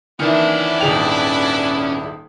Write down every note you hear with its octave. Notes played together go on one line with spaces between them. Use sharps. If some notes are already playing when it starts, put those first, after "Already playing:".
D#3 E3 B3 C#4 D4 E4 A5
D#1 G#1 G#4 G5 F7